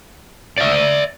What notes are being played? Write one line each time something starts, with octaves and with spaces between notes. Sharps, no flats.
D5 E5